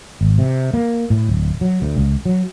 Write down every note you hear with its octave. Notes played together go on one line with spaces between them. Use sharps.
G#1
C3
A#3
A2
D1
F#3
D2
C#2
F#3